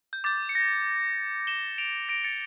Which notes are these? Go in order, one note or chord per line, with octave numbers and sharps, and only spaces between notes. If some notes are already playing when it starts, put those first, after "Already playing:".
G6
D6 G6 A6
C#7
A#6
E7 G7
D7 F7
A#6 D7
A6 C#7